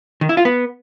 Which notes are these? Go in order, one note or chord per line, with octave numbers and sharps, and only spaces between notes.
D#3
E4
F4
B3